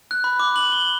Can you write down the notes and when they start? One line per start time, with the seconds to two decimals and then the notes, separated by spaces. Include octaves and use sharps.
0.11 F#6
0.24 B5
0.40 D6
0.56 F#7
0.72 G7